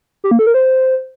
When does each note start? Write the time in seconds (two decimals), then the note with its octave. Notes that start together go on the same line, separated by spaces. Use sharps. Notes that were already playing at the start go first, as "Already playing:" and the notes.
0.24 G4
0.31 A#3
0.39 A4
0.47 A#4
0.54 C5